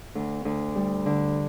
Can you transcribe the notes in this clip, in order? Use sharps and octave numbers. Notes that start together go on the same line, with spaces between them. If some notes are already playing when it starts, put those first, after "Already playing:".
D2
D2
G3
D3